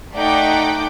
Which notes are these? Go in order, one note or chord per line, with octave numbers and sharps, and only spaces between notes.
A3 D#4 D5 F#5 G5 D6